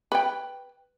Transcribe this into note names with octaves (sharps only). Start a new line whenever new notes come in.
B4 G5